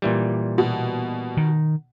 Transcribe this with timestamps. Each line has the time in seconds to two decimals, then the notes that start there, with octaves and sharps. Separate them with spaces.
0.02 A#2 E3 G3
0.58 B2
1.37 D#3